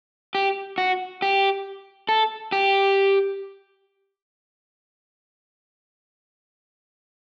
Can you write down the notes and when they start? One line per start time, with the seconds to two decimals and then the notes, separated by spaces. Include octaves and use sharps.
0.35 G4
0.78 F#4
1.22 G4
2.09 A4
2.52 G4